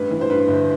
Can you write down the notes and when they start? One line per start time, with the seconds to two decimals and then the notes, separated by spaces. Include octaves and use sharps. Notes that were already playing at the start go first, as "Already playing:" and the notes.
Already playing: A1 G2 B4
0.11 E3
0.21 C5
0.30 G2 B4
0.48 G1